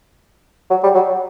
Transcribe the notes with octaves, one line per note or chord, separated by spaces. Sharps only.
F#3
G3
F#3